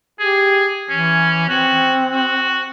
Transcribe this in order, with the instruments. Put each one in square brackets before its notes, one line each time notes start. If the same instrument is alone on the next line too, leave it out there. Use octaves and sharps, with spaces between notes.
[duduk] G4 [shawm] G#4
[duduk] E3 [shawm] C#4
[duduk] C4 [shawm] F#4
[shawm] F#4